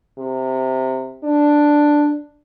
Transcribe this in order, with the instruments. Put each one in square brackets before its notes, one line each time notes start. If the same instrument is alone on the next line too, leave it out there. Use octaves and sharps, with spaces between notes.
[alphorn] C3
D4